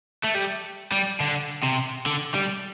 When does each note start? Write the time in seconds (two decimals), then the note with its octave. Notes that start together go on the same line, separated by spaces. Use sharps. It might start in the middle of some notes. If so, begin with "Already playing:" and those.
0.24 A3
0.35 G3
0.92 G3
1.20 D3
1.64 C3
2.06 D3
2.34 G3